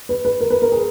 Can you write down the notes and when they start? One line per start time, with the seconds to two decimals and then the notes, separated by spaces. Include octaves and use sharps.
0.09 B4
0.25 B4
0.41 A#4
0.50 B4
0.62 A#4
0.72 G#4